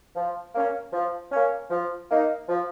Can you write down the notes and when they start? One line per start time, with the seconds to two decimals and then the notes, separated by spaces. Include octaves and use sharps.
0.16 F3
0.55 A#3 C#4
0.93 F3
1.32 A#3 C#4
1.70 F3
2.10 A#3 D#4
2.49 F3